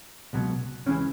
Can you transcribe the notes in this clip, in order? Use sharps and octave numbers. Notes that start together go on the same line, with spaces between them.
C#2 B2 F#3
C#2 C#3 E3 C#4